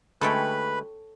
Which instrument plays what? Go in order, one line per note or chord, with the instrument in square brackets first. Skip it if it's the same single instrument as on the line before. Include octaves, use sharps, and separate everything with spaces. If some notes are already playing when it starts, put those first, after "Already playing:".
[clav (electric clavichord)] D2 G#3 E5 [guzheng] A4 C#5 G5 [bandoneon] B4 B5